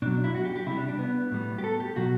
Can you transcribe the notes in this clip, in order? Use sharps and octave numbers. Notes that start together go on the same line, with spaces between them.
B2 F#3 D4
D4
E4
F#4
G4
G4
C3 G3 E4
D4
D4
B3
A2 G3
G4
A4
G4
B2 F#3 F#4